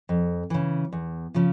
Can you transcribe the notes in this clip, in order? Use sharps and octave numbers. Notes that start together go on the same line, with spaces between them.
F2
C#3 E3
E2
C#3 F3